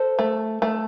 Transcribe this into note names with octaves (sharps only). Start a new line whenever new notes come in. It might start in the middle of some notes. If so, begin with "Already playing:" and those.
Already playing: A4 C5
A3
A3